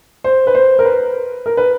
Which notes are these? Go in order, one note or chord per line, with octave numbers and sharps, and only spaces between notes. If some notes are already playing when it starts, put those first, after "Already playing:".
C5
B4
C5
A#4
B4
A#4
B4